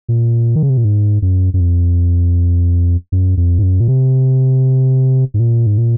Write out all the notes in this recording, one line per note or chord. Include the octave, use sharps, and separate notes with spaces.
A#2
D#3
C#3
C3
A#2
G#2
F#2
F#2
F2
F#2
F2
G#2
F#2
A#2
C3
G#2
A#2
G#2
A#2